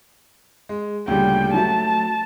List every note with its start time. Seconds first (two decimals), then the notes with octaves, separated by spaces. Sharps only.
0.69 G#3
1.08 D2 A#2 C#3 G3 G5
1.54 F#3 A3 A5